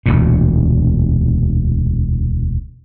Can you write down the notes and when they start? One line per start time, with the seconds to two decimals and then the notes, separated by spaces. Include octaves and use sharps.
0.06 E1 D2 A#2